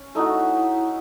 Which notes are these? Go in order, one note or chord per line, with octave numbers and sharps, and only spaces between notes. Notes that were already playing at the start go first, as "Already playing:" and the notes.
Already playing: C#4
A3 D#4 E4 F#4